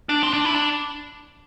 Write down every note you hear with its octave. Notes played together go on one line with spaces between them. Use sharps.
D4
C4
D4
E4
D4